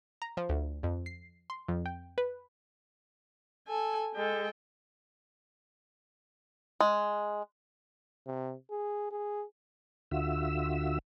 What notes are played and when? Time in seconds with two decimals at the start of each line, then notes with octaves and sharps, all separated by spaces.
0.22 A#5
0.37 F3
0.49 D2
0.83 F2
1.06 C7
1.50 C6
1.68 F2
1.86 G5
2.18 B4
3.68 A4 G#5
4.15 G#3 A4 G5
6.80 G#3
8.27 C3
8.70 G#4
9.11 G#4
10.11 D2 D3 F4 F#4 E5 E6